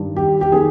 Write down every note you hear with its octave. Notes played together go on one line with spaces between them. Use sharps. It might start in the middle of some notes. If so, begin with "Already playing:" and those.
Already playing: G2 D#3
G4
G4
D#3 G#4